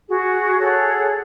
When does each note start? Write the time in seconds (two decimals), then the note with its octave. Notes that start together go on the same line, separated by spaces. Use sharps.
0.08 F#4 G#4
0.59 G#4 A4 C#5 F#5